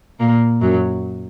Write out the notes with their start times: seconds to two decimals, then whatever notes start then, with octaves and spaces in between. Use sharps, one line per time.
0.20 A#2 A#3
0.62 F#2 F#3